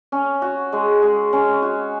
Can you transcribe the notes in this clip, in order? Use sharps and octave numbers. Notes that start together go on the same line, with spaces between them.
C#4
F#4
G#3
G#3
C#4
F#4